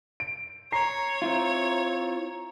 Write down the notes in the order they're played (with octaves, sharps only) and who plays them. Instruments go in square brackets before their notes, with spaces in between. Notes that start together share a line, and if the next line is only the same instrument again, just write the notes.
[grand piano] D7
[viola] C#5 [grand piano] A#5 C7
[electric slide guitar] C4 E4 F4